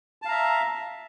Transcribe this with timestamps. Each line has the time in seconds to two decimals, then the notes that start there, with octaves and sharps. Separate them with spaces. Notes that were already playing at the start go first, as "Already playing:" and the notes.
0.22 A5
0.25 F5
0.28 A#5
0.31 E5